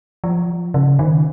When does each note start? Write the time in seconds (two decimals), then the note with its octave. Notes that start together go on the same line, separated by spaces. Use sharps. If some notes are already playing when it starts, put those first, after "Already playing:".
0.24 F3
0.74 C#3
0.99 D#3